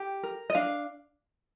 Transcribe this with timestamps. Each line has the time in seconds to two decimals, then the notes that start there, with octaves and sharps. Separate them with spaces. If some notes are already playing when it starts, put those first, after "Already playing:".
Already playing: G4
0.23 A#4
0.50 D#5
0.55 D4 F5